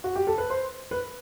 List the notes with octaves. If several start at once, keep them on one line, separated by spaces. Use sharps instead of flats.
F#4
G4
A4
B4
C5
B4